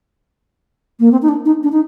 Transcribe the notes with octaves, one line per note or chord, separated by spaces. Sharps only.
A#3
C4
D#4
D4
D#4
D4
D#4